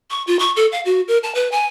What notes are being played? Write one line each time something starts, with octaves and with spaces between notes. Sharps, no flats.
C#6
F4
C#6
A4
F5
F#4
A#4
A5
B4
G#5